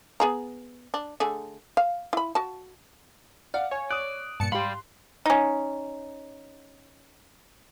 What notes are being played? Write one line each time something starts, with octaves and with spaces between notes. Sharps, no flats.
B3 G#4 A#5
D4
D3 A3 G#4
F5
E4 B5
F#4 A5
D5 F5 F#5
C#5 G#5
D5 D#6 F#6
G2 A#2 A5 C#7
G#2 G3 G4 F5 B5 C6
C#4 D#4